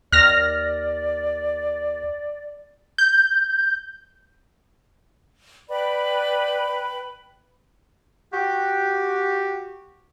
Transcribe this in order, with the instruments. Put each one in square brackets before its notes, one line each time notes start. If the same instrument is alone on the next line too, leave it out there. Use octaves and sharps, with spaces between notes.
[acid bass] D#2 [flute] D5 [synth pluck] F6 A#6
[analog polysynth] G6
[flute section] B4 G5 B5 [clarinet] D5
[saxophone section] F#4 G4